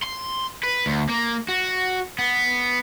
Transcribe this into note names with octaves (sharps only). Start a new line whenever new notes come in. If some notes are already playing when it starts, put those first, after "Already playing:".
C6
B4
D2
A#3
F#4
B3